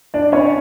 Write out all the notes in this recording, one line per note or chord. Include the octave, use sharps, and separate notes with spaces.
D4 D5
C#4 C#5